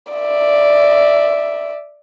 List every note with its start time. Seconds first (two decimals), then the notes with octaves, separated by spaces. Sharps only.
0.13 D5 E5